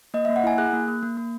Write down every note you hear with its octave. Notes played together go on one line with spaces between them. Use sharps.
A#3 D#5
A#3 E5
F#5
E4 G#5
G#4 F#6
A#3
A#3
A#3
A#3